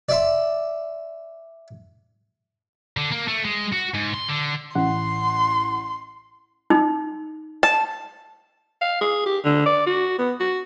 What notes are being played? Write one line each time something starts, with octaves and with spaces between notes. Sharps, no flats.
D5 E5 C6
D3
A#3
A3
G#3
F#4
G#2
C6
D3
A1 F#5 C6
D#4
A5
F5
G#4
G4
D3
D5
F#4
B3
F#4